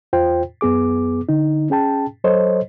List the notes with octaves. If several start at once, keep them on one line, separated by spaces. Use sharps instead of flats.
E2 F4 C5 G5
F#2 B3 G#4 D6
D3 D#4
C#4 G#4 G5 A5
F#3 A4 C5 C#5 D#5